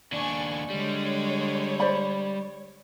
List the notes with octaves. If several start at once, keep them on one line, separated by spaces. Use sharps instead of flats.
D#2 D4 D5 G#5 C#6
D3 G3 G#3 C#5
C5 D5 B5